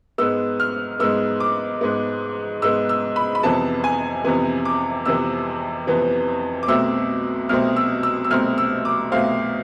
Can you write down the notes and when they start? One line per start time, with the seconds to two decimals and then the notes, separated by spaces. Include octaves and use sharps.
0.18 G#2 G#3 B3 E6
0.60 F6
1.00 G#2 G#3 B3 E6
1.40 D6
1.81 G#2 G#3 B3
2.62 G#2 G#3 B3 E6
2.89 E6
3.16 B5
3.35 B5
3.43 F2 C3 E3 B3 A5
3.84 G#5
4.24 F2 C3 E3 B3 G#5
4.65 D6
5.05 F2 C3 E3 B3 E6
5.87 F2 C3 E3 B3
6.63 D6
6.68 C2 B2 A3 C4 E6
7.49 C2 B2 A3 C4 F6
7.76 E6
8.03 E6
8.24 E6
8.31 C2 B2 A3 C4 F6
8.58 E6
8.85 D6
9.12 C2 B2 A3 C4 F5